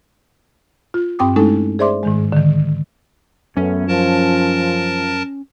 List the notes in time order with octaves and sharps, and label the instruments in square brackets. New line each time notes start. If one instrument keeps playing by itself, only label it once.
[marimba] F4
G2 C4 G5 D6 D#6
G#3 A3 C#4 D#4 E4 A4
G#4 C5 D5 E5 C6 D6
G#2 D#3 G#3
D3 D#3
[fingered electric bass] F#2 [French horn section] A3 B3 [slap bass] C#4
[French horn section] F3 [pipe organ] A#4 A5